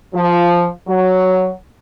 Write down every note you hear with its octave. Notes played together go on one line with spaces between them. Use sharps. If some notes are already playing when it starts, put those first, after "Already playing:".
F3
F#3